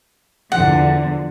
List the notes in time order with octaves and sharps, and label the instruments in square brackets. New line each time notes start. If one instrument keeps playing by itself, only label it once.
[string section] E2 D3 F3 [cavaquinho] F#5